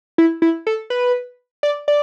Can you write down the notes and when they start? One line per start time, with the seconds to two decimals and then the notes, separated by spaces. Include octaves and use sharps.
0.18 E4
0.42 E4
0.67 A4
0.90 B4
1.63 D5
1.88 D5